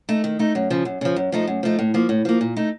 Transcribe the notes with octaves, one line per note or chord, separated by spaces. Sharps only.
A3 D#4
D#3
A3 D#4
F#2
C#3 F3
F#2
C#3 F3
F#2
F3 A3 D#4
F#2
F3 A3 D#4
A2
F3 A#3
A2
F3 A#3
A#2
A3 D#4